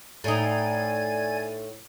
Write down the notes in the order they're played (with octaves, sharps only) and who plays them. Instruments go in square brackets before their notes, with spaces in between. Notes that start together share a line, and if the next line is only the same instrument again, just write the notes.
[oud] A2 D#4 [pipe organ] D5 G#5 G#6